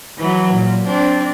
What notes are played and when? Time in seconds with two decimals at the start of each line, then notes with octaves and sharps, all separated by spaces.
0.18 E3 F#3
0.53 A#2
0.86 C4 D4